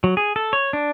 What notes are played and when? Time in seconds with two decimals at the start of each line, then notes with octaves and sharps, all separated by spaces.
0.04 F#3
0.17 G#4
0.36 A4
0.53 C#5
0.73 D4